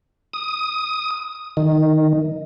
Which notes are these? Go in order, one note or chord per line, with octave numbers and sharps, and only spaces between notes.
D#6
D#3